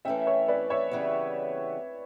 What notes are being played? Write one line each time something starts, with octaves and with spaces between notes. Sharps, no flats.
E3 A3 C#4 E5 G5
C#5
B4 D5
C#5 E5
C#3 E3 G3 B3